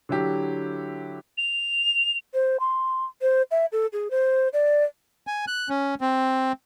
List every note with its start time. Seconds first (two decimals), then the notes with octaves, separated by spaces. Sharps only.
0.09 D3 F#3 E4 G4
1.38 F7
2.34 C5
2.60 C6
3.22 C5
3.51 E5
3.72 A4
3.93 G#4
4.11 C5
4.53 D5
5.27 G#5
5.47 F#6
5.69 C#4
6.01 C4